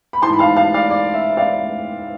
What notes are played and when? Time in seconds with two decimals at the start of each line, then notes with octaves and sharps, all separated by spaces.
0.13 B5
0.22 E3 A5 C6
0.27 G#2
0.33 B5
0.39 F5 A5
0.56 F5 A5
0.74 D5 F5
0.90 D5
1.14 E5
1.37 D5 F5